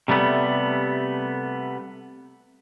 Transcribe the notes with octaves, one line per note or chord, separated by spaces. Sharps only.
C3 G3 A3 B3